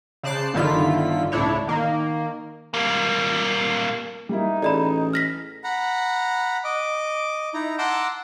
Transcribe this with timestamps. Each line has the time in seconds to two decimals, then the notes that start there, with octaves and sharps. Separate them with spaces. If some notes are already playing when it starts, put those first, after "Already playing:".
0.23 C#3 C5 D5 A5 F#6 C7
0.54 G1 D3 D#3 E4 F4 B6
1.32 C#2 A2 D4 E4 C#5
1.67 D#3 A#3
2.74 G3 A#3
4.29 G3 A#3 D#4 E4
4.62 A1 G#4 A4 D5 D#5 B5
5.13 F6 A#6 B6
5.64 F#5 A#5 B5
6.64 D#5 D6
7.54 D#4 E4 A#5
7.78 F#5 A5 A#5 C6 D6 E6